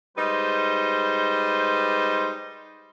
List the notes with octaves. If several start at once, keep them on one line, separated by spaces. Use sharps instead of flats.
G3 G#3 D#4 B4 C5